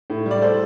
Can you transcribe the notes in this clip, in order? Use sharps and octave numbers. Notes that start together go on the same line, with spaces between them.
A2
G3 D5
A4 C5